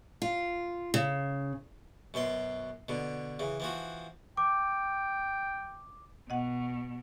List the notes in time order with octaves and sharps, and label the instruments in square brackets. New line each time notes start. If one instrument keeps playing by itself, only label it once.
[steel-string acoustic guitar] F4
C#3
[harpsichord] F#2 B2 B4 C6
B2 D3
C#3 E3
E3 F3 F#4
[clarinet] G5 [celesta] D6
[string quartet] B2 [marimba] D#5 F#5